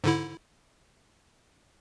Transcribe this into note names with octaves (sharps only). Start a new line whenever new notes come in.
G#2 D3 E4